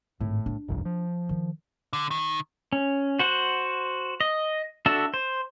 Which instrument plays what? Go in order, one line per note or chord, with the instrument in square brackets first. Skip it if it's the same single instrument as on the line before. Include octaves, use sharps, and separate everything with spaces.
[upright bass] G#1 [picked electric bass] A2
[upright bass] D4
[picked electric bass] G1 C2 F2
F3
[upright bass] D#3
[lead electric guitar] D3
D#3
[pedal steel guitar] C#4
F#4 C5 F#5
D#5
D4 F#4 A4 E5
C5